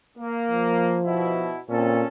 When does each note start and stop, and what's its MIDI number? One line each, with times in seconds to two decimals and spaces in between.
0.18 0.98 58
0.51 1.51 53
1.05 1.59 47
1.05 1.59 64
1.69 2.03 46
1.69 2.07 60
1.69 2.07 61
1.69 2.07 69